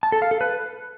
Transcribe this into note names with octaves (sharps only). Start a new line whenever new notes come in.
A5
A4
F5
A4
B4